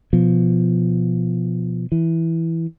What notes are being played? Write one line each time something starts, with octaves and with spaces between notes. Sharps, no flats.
B2 F3
E3